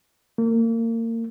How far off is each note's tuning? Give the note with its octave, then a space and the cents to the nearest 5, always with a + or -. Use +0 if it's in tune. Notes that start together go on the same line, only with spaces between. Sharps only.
A#3 -30